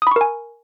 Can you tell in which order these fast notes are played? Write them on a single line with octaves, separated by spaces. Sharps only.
D#6 B5 C#6 A#4 G#5